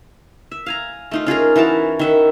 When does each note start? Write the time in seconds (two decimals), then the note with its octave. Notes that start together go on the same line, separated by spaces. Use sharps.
0.51 E5
0.66 F5 G#5 A#5
1.11 A3 D#4 F4
1.26 C#4 F4 G#4 A#4
1.56 E3 F#4 A#4 A5
1.99 D#3 E5 F#5